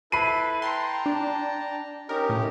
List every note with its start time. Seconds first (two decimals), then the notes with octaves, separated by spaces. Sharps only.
0.12 E4 A4 B4 B5 C7 D#7
0.62 G5 A5 A#5 C6
1.06 D4
2.09 C#4 D#4 G4 A#4
2.29 A2